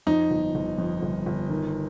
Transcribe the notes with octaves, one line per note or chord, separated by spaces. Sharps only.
F2 D#4
G1
G1
F2
G1
G1
D#3